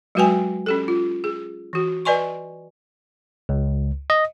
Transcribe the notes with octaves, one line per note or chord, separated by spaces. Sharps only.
F#3 G#3 F#4 B4 G5 G#5
C#4 G4 A4
F4
G#4
E3 F#4
B4 D5 D#5 G#5 C6 C#6
C#2
D#5